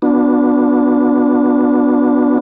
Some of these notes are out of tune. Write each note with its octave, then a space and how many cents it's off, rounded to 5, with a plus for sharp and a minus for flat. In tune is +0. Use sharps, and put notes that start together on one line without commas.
B3 +0 D4 +0 F#4 -40